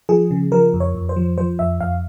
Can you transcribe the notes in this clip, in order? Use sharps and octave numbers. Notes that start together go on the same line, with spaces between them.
F3 G#4
C#3
F3 A#4
F2
C#5
F2
C5
F3
F3 C5
F2 E5
F2 F5